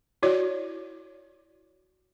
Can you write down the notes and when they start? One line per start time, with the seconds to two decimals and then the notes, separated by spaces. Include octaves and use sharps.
0.23 E4 F#4 C#5 D5